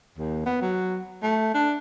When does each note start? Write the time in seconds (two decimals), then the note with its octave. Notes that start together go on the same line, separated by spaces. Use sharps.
0.18 D#2
0.46 B3
0.61 F#3
1.23 A3
1.54 D4